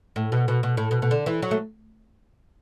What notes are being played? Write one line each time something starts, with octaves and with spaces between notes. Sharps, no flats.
A2
B2
B2
B2
A2
B2
B2
D3
E3
F#3
A3